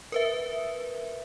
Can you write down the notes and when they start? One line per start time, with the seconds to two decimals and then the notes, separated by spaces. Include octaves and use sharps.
0.12 A#4 B4 E5